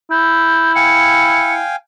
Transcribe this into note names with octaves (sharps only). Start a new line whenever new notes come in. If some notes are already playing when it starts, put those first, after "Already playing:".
E4 G6
F5 G5 G#5 C#7